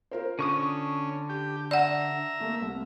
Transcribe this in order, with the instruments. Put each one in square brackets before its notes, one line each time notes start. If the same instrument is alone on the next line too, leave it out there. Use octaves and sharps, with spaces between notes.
[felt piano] F4 A#4 C5
[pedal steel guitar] D3 C#6 D#6 [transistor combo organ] C#4
[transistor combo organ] G4
[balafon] D5 F#5 [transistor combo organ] E5 A#5
[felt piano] A3 A#3
C2